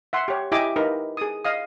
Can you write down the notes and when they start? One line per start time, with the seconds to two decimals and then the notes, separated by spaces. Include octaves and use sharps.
0.13 E5 F#5 C6
0.28 G4 C#5
0.52 E4 G4 D#5 E5 G#5 D6
0.76 D#4 A#4 B4
1.17 G#4 D#6
1.45 D#5 F5 D#6